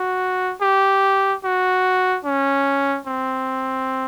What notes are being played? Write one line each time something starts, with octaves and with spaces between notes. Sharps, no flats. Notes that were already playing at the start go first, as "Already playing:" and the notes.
Already playing: F#4
G4
F#4
C#4
C4